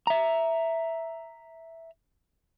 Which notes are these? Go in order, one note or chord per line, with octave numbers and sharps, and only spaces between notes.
E5 A#5